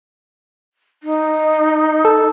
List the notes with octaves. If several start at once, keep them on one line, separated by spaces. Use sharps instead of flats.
D#4
A4